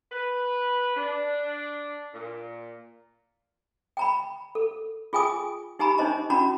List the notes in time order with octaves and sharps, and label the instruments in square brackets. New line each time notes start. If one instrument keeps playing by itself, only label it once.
[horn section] B4
D4
A#2
[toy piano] G5 A#5 B5
A4
F4 G#4 G5 G#5 D#6
D#4 G4 G#5 A#5 B5
D4 D#4 C5 D#5 A#5
C#4 D4 E4 F#4 A#5 B5